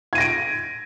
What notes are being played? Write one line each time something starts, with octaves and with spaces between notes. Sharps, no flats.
G#6 A#6 D7 D#7